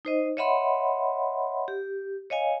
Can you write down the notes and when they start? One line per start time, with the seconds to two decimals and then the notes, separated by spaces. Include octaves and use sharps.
0.05 D#4 C5 D#5
0.37 C#5 D#5 E5 F#5 B5 C6
1.68 G4
2.30 C#5 D#5 F5 G#5